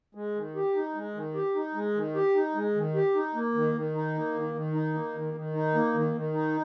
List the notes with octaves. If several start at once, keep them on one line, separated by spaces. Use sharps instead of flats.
G#3
D#3
G4
D#4
G#3
D#3
G4
D#4
G#3
D#3
G4
D#4
G#3
D#3
G4
D#4
A#3
D#3
D#3
D#4
A#3
D#3
D#3
D#4
A#3
D#3
D#3
D#4
A#3
D#3
D#3
D#4